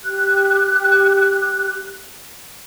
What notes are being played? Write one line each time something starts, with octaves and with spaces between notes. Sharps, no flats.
G4 F#6